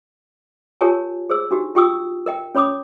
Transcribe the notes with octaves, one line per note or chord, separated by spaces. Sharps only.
F4 G4 A#4 C#5 G#5 A5
G#4 C5 E6
D4 D#4 F#4 G4
F4 G4 G5 C#6 D#6 E6
A#4 D#5 G5
C#4 C#5 B5 D6 D#6